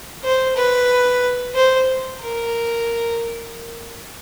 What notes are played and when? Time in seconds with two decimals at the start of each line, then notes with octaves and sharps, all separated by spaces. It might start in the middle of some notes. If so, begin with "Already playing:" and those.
0.24 C5
0.56 B4
1.55 C5
2.21 A#4